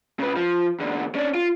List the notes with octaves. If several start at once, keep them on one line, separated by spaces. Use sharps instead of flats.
C#3 B4
F3
E2 D3
C#4 D4
F4